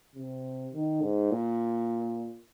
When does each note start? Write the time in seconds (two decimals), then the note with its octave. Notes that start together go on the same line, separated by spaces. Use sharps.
0.15 C3
0.73 D#3
1.02 G#2
1.31 A#2